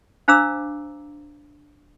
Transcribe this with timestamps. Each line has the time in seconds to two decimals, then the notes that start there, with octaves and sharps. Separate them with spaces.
0.28 D4 C5 F5 A#5 D6 E6